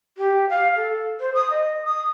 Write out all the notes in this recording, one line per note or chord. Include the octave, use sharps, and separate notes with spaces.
G4
F5
A4
C5
D#6
D#5
D#6